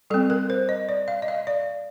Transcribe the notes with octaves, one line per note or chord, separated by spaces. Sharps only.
G3 C4 A4
A#4
C5
D#5
D5
F5
D#5
F5
D5